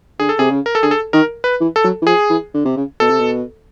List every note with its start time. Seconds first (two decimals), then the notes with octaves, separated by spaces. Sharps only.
0.19 D3 G#4
0.29 A4
0.39 C3 G#4
0.50 C#3
0.66 A#4
0.75 A4
0.83 D3 G#4
0.91 A4
1.13 D#3 A#4
1.44 B4
1.60 E3
1.76 A4
1.84 F#3
2.02 E3
2.06 F3 G#4
2.30 E3
2.54 D3
2.65 C3
2.76 C#3
3.00 B2 A4
3.10 C3
3.20 B2